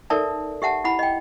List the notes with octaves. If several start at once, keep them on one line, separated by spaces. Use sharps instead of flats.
D#4 A4 A#4 D5 E5 A5
G4 E5 F#5 A5
E4 F#5 B5
D#5 G5